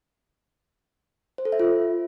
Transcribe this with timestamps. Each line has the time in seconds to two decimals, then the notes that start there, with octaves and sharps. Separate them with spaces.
1.38 C5
1.45 A4
1.52 E5
1.60 F4